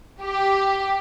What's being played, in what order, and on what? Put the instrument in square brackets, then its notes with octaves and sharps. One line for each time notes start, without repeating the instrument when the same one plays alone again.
[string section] G4